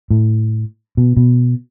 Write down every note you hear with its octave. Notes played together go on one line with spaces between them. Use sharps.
A2
B2
B2